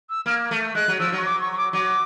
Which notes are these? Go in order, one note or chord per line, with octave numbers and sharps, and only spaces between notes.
E6
A#3 F6
A3
G#3 F#6
F#3
F3 E6
F#3 C#6
D6
C#6
C#6
D6
F#3 D6